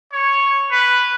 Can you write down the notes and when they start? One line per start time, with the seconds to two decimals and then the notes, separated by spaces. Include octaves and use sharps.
0.12 C#5
0.71 B4